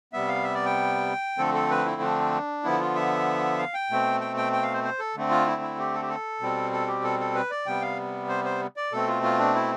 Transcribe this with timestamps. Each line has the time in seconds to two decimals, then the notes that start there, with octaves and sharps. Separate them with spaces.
0.13 C3 G3 B3 E5
0.28 F5
0.44 E5
0.54 D5
0.65 G5
1.38 D3 F3 A3 C4 A4
1.54 A4
1.70 B4
1.85 E4
2.01 D4
2.64 D3 F3 B3 E4
2.80 F4
2.95 E5
3.58 F5
3.74 G5
3.90 B2 A3 C4
4.21 G5
4.37 G5
4.53 G5
4.62 F5
4.73 C5
4.84 C5
4.99 A4
5.15 D3 A3 C4
5.30 F4
5.47 E4
5.62 E4
5.78 G4
5.93 A4
6.02 G4
6.09 A4
6.40 B2 G3 C4
6.72 A4
6.87 G4
7.04 A4
7.19 A4
7.35 B4
7.50 D5
7.66 C3 G3 B3 G5
7.81 F5
8.29 C5
8.45 C5
8.76 D5
8.92 B2 A3 C4 A4
9.08 F4
9.23 F4
9.39 D4
9.55 E4